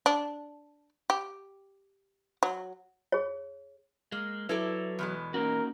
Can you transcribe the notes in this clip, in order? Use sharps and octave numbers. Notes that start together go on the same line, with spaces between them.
D4
G4
F#3
G#4 C#5
G#3 A#3
F#3 E4 A4 B4 D5
E2 B2 G#3
A#3 C#4 D#4 F#4 A#4